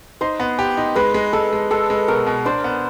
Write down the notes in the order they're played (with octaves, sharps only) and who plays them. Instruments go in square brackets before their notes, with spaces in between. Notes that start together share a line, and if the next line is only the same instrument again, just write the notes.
[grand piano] D#4 [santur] C5
[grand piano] B3
G4
D#4
[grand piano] G#3 [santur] B4
[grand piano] G#3
[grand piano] G#3 [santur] A4
[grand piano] G#3
[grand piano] G#3 [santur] A4
[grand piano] G#3
[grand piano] B2 [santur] A#4
[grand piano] B2
[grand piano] D4 [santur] C5
[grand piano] B3